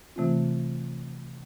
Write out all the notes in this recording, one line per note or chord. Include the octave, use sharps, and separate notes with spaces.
C3 E3 A3 C4 F4